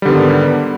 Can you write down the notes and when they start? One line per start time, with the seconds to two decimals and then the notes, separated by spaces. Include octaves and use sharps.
0.02 G3
0.05 D3
0.09 B3
0.12 D#3
0.15 G#2